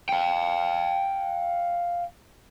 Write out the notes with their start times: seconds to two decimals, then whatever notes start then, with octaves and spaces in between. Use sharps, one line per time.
0.09 F5 G5